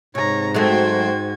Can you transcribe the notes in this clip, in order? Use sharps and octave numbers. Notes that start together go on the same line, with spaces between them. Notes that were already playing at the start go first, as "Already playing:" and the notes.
G#2 C3 C#5 A#5
F#3 G#3 A3 F#4 C5 G5 G#6